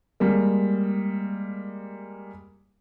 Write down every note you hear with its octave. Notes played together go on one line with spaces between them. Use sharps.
G3 G#3 A#3